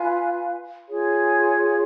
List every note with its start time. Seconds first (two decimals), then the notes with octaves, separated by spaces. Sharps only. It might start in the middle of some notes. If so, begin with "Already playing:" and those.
Already playing: F4 B4 F5 G#5
0.87 F4 G#4 C#5